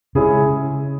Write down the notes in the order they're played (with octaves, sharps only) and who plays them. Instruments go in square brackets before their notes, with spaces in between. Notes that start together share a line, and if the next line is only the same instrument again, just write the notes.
[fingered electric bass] C#3 [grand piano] G#3 C#4 E4 G#4